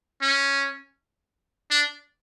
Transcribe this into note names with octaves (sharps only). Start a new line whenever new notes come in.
C#4
D4